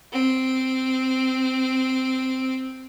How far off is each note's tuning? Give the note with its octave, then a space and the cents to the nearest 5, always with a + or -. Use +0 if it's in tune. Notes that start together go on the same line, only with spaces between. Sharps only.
C4 -5